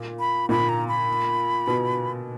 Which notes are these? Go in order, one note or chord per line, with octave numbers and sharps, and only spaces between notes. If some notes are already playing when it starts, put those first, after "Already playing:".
Already playing: A#2
B5
A#2 B5
A#5
B5
B2